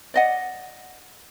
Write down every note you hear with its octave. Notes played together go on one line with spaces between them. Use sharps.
D5 D#5 F#5